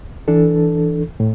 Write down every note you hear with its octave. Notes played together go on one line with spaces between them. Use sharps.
E3 D4 A4
A2